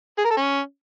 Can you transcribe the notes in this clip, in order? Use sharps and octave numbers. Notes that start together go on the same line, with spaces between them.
G#4
A#4
A4
C#4